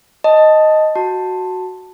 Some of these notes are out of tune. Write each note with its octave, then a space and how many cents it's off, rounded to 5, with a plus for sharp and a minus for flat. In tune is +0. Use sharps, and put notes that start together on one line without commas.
D#5 +0 A5 +0
F#4 +0 A5 +10